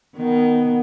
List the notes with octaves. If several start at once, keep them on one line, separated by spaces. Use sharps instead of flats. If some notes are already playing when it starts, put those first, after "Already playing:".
D#3 B3